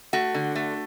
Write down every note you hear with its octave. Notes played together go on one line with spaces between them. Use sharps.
A3 F#4
D3
A3